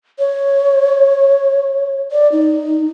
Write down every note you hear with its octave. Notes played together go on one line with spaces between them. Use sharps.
C#5
D5
D#4